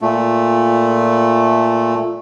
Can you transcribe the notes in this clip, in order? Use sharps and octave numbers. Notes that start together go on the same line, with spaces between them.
A#2 A3